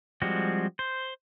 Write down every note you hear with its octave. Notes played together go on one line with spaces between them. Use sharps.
F3 G3 G#3 C4 F#4
C5